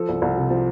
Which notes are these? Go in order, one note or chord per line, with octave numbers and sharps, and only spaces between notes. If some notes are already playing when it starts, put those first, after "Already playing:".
Already playing: F3 A4
C2
C2
C3
F3